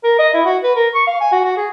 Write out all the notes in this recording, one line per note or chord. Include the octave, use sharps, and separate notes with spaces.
A#4
D#5
E4
F#4
B4
A#4
C#6
F5
G#5
F#4
F#4
G#4